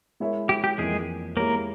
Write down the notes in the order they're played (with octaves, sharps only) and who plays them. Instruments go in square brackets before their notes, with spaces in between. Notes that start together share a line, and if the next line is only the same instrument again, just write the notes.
[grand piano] G#3 E4 A#4 C#5 E5
[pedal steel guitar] G4
G4
[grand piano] F2 E3 A#3 [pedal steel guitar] G#3 G#4
[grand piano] G#3 E4 G4 C#5 [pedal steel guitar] A#3 A#4